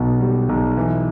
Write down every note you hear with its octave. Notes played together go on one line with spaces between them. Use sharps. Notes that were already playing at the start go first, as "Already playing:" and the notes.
Already playing: B1 B2
G3
B1
E3